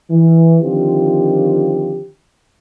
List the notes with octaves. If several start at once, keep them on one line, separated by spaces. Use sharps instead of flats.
E3
D3 D#3 F3 C4 F4 G4